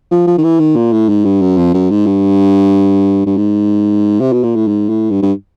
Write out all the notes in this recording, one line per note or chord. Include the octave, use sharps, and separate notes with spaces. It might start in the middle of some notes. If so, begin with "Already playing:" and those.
F3
F3
D#3
E3
D#3
A#2
A2
G#2
G2
F#2
F2
F#2
G#2
G2
G2
G#2
C3
B2
A#2
A2
G#2
A2
G2
G2